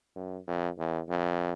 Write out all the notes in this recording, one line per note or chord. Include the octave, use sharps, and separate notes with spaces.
F#2
F2
E2
F2